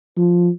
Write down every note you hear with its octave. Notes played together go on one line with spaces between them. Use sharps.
F3